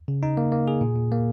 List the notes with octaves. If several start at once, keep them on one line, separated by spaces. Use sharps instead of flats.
C#3
D#4
A#3
A#3
G#4
A#2
A#2
A#3